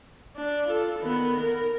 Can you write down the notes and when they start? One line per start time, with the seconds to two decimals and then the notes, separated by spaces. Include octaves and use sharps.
0.37 D4
0.67 F4 A4
0.99 D#3 B3
1.40 A#4